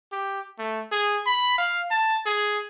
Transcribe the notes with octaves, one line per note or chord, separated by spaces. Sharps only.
G4
A3
G#4
B5
F5
A5
G#4